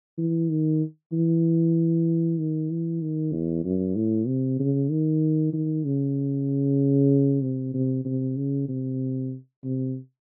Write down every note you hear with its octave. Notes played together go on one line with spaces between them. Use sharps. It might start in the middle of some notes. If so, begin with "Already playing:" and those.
E3
D#3
E3
D#3
E3
D#3
E2
F#2
A2
C3
C#3
D#3
D#3
C#3
C3
C3
C3
C#3
C3
C3